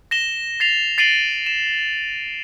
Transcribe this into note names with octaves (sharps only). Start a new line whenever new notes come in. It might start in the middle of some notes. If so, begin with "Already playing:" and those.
A#6 E7 G7
A6 C7 F7
A6 C7 D7 D#7 F#7 G7
E7